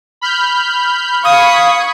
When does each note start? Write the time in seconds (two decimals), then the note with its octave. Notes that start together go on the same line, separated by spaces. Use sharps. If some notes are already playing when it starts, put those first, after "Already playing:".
0.21 B5 F6 G6
1.25 F5 B5 C#6 D#6 G#6